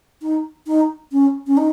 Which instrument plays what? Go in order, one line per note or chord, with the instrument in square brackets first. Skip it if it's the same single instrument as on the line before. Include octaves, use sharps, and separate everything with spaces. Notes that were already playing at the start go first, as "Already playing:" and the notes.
[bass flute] D#4
D#4
C#4
C#4
D#4